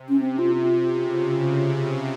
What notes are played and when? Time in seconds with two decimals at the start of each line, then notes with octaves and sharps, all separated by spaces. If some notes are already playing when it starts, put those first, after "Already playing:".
Already playing: C3
0.09 C#4
0.20 C4
0.39 F4
0.56 F4
0.89 C#3